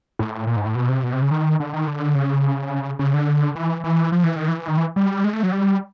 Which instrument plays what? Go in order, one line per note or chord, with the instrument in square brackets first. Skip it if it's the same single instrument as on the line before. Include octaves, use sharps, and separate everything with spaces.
[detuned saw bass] A2
A#2
G#2
A2
B2
C3
B2
C3
C#3
D#3
D3
D#3
D3
C#3
C#3
D3
E3
E3
F3
E3
D#3
E3
D#3
E3
G3
G#3
A3
F#3
G3